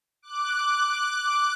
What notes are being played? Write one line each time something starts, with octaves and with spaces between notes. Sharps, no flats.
D6 F#6
D6 F#6